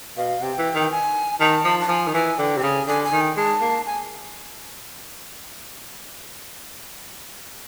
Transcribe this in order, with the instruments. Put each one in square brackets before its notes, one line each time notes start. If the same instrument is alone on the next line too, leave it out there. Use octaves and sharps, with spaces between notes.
[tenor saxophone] B2 [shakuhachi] F5
[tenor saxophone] C3 [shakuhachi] G5
[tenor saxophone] E3
[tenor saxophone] D#3 [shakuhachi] G5
[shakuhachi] G#5
[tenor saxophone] D#3 [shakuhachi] A5
[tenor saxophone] F3
[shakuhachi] A5
[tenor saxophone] F3 [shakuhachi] G#5
[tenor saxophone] D#3
[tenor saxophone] E3 [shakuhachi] G#5
[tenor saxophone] D3 [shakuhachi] G5
[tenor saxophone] C3 [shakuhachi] G5
[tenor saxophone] C#3 [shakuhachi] G#5
[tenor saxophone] D3 [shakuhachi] G#5
[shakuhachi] G#5
[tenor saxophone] D#3
[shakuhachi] G5
[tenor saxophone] G#3 [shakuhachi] A5
[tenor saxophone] A#3
[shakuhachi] G#5